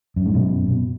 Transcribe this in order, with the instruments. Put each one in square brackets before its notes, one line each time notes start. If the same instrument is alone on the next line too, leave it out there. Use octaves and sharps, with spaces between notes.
[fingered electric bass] F#2
G#2
F#2 B2
B2